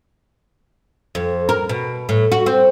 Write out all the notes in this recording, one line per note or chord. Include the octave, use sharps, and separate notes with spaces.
F2
A#4
B2
A2
F#4
C4